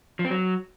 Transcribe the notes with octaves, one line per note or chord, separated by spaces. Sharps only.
F3
C4
F#3